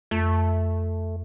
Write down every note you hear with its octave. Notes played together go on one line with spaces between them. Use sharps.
F2 A3